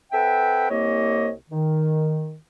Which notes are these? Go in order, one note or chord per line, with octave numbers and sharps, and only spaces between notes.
C4 A4 B4 E5 F#5 G5
C2 A#3 C#5 D#5
D#3